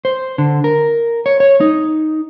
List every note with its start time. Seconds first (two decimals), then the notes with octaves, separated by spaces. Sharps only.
0.05 C5
0.38 D3
0.64 A#4
1.26 C#5
1.40 C#5
1.60 D#4